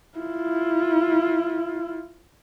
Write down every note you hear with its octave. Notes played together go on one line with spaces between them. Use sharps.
E4 F4